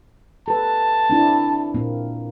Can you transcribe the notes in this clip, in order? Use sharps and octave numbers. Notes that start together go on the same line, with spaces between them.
A4 B4 A5
C4 D4 E4
A#2 A#3 C4